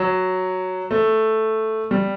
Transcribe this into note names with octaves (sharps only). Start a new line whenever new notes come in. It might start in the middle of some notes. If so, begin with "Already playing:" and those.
Already playing: F#3
A3
G3